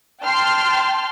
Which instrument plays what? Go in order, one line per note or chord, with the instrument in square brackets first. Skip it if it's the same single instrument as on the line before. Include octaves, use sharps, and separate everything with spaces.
[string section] G5 A5 C6 F6 G6